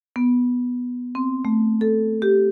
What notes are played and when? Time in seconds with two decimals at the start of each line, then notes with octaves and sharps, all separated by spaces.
0.16 B3
1.15 C4
1.45 A3
1.81 A4
2.22 G4